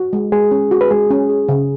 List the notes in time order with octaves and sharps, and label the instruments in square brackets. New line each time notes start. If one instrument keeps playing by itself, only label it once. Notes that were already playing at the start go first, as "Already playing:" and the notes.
Already playing: [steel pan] F#4
G#3
[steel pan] G#3 [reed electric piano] G#4
[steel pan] C#4
F#4
[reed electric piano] B4
[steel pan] G#3 [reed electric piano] G#4
[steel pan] C#4
G#4
C#3